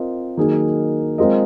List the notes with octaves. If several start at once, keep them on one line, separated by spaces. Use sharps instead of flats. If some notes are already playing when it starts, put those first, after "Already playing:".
Already playing: C4 F4 A#4 D#5
D#3 F#3 A#3 D#4 G#4
G#3 C4 F4 A#4 D#5